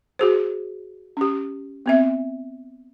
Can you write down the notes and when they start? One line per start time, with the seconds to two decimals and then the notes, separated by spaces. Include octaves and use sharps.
0.19 F#4 G#4 C5
1.17 C#4 G4
1.86 B3 C4 E5